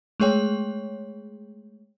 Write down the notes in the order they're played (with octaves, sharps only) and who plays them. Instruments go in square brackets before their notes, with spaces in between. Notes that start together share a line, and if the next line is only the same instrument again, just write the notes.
[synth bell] G#3 A3 G#4 C#5 G5